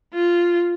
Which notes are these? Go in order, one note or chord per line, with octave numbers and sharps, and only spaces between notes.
F4